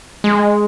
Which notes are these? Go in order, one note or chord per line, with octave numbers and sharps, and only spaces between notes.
G#3